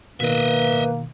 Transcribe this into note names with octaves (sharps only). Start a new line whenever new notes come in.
B2 D#3 A#3 B4 D#5 E5